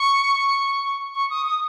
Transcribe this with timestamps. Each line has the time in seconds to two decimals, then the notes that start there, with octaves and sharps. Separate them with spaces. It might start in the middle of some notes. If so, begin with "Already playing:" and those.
Already playing: C#6
1.15 C#6
1.30 D#6
1.46 D#6